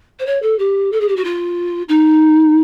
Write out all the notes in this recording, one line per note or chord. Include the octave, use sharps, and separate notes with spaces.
C5
C#5
A4
G4
A4
G#4
G4
F#4
F4
D#4